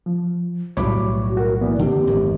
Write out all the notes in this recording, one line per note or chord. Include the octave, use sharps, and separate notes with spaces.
F3
B1 A2 G3 F#4 C#5 B5 D6
F#4 A#4
E3 A#3 B3 D5
D3 C4 G4
G#1 F#2